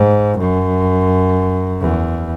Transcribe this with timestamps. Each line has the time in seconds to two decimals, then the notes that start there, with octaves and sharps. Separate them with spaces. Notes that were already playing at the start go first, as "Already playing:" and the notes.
Already playing: G#2
0.38 F#2
1.81 E2